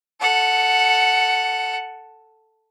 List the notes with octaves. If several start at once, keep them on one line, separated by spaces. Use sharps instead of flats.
A4 F#5